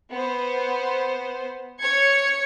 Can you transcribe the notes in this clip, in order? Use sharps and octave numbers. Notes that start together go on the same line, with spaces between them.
B3 C5
C#5 G#6 C#7